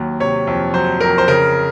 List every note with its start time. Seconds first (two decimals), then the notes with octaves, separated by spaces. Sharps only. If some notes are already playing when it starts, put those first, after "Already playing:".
Already playing: D#2 F#3
0.20 C3 C#5
0.47 F2
0.74 F#3 C5
1.00 F2 A#4
1.18 C5
1.28 C#3 A#4